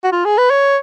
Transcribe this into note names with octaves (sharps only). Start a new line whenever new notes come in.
F#4
F4
G#4
B4
C#5